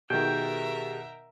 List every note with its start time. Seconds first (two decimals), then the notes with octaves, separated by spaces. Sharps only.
0.10 B2 D#3 G4 G#4 A#4 E5 G5